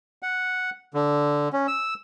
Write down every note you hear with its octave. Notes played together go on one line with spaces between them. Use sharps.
F#5
D3
C#4
E6